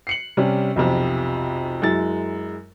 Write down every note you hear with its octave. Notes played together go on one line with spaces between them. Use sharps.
C7 C#7 F#7
C3 G3 C#4
B1 F2 C3 F3
F#2 G#3 E4 A6